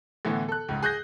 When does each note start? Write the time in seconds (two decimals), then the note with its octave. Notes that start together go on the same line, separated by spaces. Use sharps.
0.25 A2 D3 E3 B3
0.48 A4 F#6
0.68 C#2 G#2
0.83 G#4 F#6 G6 A#6